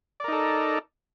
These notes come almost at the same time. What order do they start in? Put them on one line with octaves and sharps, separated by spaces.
D5 A#4 D#4 A4